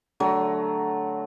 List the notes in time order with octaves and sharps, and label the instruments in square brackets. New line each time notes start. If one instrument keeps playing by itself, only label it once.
[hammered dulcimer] D3 F#3 A3